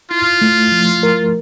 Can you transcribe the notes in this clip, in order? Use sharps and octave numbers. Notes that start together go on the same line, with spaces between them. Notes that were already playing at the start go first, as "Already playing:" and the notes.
E4 F4
A3
F3
A#4